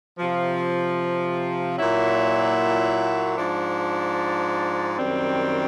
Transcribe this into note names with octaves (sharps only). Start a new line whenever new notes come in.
C3 F3
A#2 F#3 E4
G#2 F3 D4
F#2 D#3 G3 C4